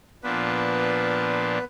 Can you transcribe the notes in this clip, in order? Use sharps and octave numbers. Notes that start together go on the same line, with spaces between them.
A#2 F3 B3 D4 B4